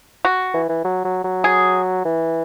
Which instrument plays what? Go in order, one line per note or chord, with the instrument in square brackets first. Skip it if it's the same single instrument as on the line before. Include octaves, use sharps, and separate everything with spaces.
[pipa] F#4
[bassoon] E3
E3
F#3
F#3
F#3
[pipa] G#4
[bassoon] E3